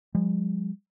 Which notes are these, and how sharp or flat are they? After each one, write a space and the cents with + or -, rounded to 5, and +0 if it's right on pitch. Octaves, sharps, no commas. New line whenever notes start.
F3 +30 G#3 -40